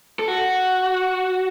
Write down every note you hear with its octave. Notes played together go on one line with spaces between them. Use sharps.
A4
F#4